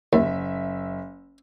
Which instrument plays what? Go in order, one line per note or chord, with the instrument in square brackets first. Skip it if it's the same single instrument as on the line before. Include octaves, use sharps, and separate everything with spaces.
[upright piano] F#1 E5 [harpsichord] D#2